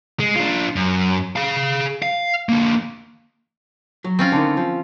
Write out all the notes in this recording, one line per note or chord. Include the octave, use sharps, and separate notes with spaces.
G#3
D4 F4
F#2
G#4 F5
F5
D3 A#3
F#3
C4 C#4 F4
D3 D#3
F3